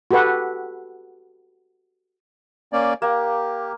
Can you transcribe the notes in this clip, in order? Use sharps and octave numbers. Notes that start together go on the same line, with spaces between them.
F#4 G4 A4 B4 F#5
A#3 C#4 D5
A#3 G4